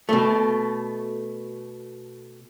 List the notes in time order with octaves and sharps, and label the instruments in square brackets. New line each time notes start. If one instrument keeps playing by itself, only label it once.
[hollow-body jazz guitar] B2 A3